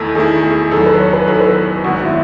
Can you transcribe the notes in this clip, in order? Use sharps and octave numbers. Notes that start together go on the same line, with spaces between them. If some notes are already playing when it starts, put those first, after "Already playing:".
Already playing: E2 D#3 A3 E4 A4
E2 D#3 A3 E4 G#4
G#4
E2 D#3 F#3 A4
B4
C#5
B4
E2 D#3 F#3 A4
B4
G#1 F#2 D#3 G#3 B3 F#4
E4